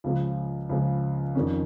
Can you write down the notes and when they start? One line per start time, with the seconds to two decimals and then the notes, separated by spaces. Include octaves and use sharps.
0.04 C#2 C#3 F3
0.69 C#2 C#3 F3
1.35 F2 D#3 C#4